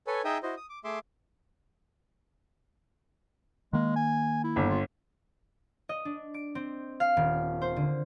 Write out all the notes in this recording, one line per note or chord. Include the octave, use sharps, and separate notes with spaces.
A4 B4 C#5 G#5
D#4 G#4 D#5 E5 G5 D#6
E4 F#4 C5 D#5
D#6
D6
A3 G#4 E5 C6 D6
D#3 G#3 A#3
G#5
E4
G1
F4
D#5
D4
D7
C4
F5
D#1
C5
D3